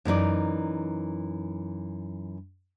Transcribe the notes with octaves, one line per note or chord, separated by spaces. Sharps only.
F#2 E3 D#4 D5